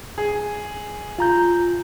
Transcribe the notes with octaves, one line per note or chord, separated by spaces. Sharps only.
G#4
F4 A#5 G6